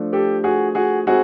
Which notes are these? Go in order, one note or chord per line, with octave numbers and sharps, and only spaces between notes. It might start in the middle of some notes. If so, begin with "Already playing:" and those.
Already playing: F3 A3 D4
G4 A4
F#4 G#4
F#4 G#4
G#3 C4 D#4 F#4 G#4